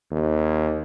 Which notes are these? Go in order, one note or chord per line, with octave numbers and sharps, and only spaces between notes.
D#2